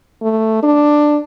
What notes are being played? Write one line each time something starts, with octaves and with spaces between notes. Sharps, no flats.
A3
D4